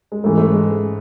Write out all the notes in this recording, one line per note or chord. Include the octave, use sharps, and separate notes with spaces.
G#3
G#2 E3 A3
A3
G#3